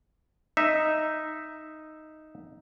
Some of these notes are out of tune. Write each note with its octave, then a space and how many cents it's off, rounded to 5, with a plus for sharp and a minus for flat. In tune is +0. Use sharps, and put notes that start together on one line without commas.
D#4 +0 E5 +0